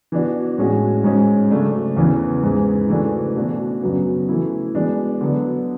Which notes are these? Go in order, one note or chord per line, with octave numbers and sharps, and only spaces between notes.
E3 B3 D4 F#4
A2 G#3 C#4 F#4
G#2 G#3 C#4
C#3 F#3 A3 D4
E2 C#3 E3 B3
G#2 E3 G#3
C#3 E3 A3 D4 F#4
B2 A3 D4 F#4
F#2 C#3 F#3 B3 F#4
E3 A3 E4
E3 G#3 B3 D4 F#4
D3 F#3 B3